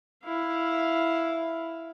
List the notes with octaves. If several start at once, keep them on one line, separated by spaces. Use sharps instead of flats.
E4 F5